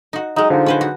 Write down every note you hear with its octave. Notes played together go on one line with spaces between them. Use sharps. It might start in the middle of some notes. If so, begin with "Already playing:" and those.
D#4 F#4
F#3 G#3 D#4
D3 F3 D#4
C#4 B4 C5
F#4